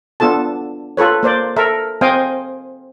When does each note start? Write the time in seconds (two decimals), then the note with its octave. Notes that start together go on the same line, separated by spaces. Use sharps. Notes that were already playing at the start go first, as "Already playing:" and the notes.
0.20 B3 D4 F4 A4 A5
0.97 F4 A4 B4 C#5
1.23 A#3 C5 D5
1.56 A4 A#4 E5
2.01 C4 C5 D#5 F5 G5 G#5